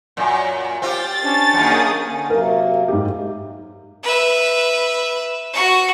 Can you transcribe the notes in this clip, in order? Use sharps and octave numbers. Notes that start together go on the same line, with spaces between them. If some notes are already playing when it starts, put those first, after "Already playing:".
F#2 A#2
C4 F4 G4 A6
C#4 D4
F#2 D#3 A#3 G#4 D#6
D3 C#4
C3 F#3 A#3 A#4
G#2 G4
B4 E5
F#4 C#6